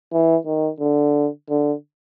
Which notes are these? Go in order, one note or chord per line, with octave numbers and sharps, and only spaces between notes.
E3
D#3
D3
D3